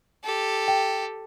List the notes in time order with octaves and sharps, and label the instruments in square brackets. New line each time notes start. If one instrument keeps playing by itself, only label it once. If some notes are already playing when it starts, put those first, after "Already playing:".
[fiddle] G4 A4
[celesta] G5